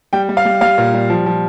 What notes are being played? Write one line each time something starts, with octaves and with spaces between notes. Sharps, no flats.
G3 G5
G3
F5
G3
G3 F5
A#2
G3
F3
F3